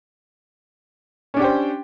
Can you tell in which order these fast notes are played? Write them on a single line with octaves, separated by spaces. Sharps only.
C#4 D4 G4 G5 C5